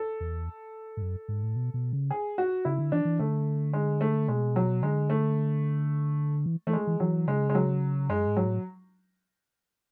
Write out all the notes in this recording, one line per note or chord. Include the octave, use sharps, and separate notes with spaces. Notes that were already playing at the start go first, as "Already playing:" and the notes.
Already playing: A4
E2
G#2
F#2
G#2
A2
B2
B2
C#3
G#4
F#4
C#3 E4
D3
E3 D4
E3
D3 A3
G#3
A3
B2 G#3
F#3
D3 G#3
A3
E3
E3 A3
G#3
E3
E3 F#3
C#3 G#3
G#3
F#3
F#2 G#3
G#2
F#3
A2